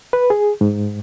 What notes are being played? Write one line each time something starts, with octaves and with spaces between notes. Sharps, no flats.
B4
G#4
G#2